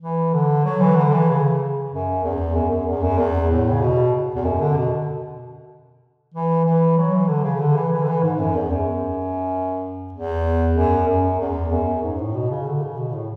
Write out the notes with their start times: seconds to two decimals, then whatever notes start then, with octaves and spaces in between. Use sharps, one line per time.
0.02 E3
0.33 D3
0.65 F#3
0.81 E3
0.96 D3
1.12 E3
1.29 C#3
1.91 F#2
2.23 E2
2.55 F#2
2.70 F#2
2.86 E2
3.02 F#2
3.18 E2
3.50 A2
3.71 C#3
3.81 B2
4.35 E2
4.44 F#2
4.61 D3
4.76 B2
6.34 E3
6.65 E3
6.97 F#3
7.13 E3
7.29 D3
7.44 C#3
7.60 D3
7.76 E3
7.92 E3
8.03 D3
8.08 E3
8.23 G#2
8.40 F#2
8.55 E2
8.71 F#2
10.13 E2
10.76 F#2
11.07 F#2
11.40 E2
11.71 F#2
12.02 G#2
12.18 A2
12.34 B2
12.50 C#3
12.66 D3
12.82 C#3
12.97 B2
13.12 A2